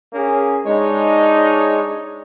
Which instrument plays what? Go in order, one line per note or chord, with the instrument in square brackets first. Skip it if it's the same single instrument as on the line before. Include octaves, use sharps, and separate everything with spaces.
[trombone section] A#3 C#4 G#4
[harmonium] G#3 C#5 [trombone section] D4 D#4